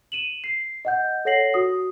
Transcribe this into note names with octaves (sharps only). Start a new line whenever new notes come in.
D#7 E7 F#7
C7
D#5 F#5 G6
A4 C#5 F#5 A#6 C7 F#7
F#4 D#6